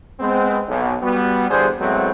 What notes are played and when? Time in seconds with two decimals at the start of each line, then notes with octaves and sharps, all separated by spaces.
0.20 G#3 B3 C4
0.69 B1
1.03 G3 B3 F#4
1.50 E2 D3 G3 G#4 C5
1.80 A2 F#3 G#3 A3 B3 C4